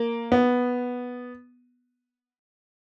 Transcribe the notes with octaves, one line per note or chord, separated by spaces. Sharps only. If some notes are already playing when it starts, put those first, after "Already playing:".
Already playing: A#3
B3